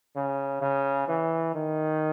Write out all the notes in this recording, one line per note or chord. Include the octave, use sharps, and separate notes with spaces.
C#3
C#3
E3
D#3